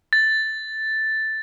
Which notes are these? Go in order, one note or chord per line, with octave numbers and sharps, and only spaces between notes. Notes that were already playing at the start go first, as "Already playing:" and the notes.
A6